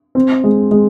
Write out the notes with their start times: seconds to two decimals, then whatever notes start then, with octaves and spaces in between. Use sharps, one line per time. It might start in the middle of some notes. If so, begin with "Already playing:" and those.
0.15 C4
0.44 G#3
0.71 G#3